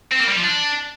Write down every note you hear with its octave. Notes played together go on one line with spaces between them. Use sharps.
C4
A#3
G3
F3
D4